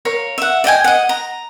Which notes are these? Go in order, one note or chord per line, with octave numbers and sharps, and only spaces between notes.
A#4 C#5 F5
E5 F#5
D5 D#5 G5 G#5
D#5 F#5
A#5